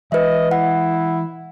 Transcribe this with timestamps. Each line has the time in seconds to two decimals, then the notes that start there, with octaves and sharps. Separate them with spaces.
0.12 E3 G#3 B4 D#5 E5
0.51 E4 F#5